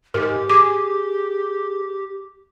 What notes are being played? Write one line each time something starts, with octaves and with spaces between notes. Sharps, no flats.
G#2 G4 A#4
G#4 D6